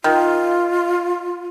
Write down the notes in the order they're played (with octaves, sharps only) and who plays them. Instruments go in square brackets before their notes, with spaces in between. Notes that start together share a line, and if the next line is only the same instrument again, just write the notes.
[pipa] D#3 [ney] F4